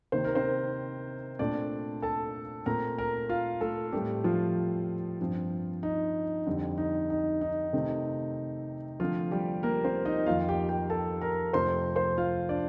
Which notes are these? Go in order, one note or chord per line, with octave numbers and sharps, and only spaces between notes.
C3 D#3 A#3 C5
A#4
C4 C5
A#2 A3 C4 D4 D5
A4 A5
A#2 A3 C4 A#4 A#5
A#4 A#5
F4 F5
A3 A4
A2 G3 A3 C4 G4
F3 F4
G2 F3 C4
D#4
F2 D3 G3 C4
D#4
D#4
D#4
C3 D#3 A3 C4
D3 F3 A3 C4 F4
G3 G4
A#3 A#4
C4 C5
D#4 D#5
F2 D#3 A#3 F4 F5
G4 G5
G4 G5
A4 A5
A#4 A#5
F2 C3 F3 A3 C5 C6
C5 C6
F4 F5
D4 D5